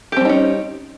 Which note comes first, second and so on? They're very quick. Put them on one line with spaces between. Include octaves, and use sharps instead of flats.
G4 C4 G3 D#4 C#4